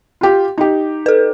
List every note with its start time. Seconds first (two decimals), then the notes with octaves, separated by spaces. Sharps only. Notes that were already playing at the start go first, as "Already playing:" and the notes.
0.21 F4 G4
0.58 D#4 G4
1.06 A4 B4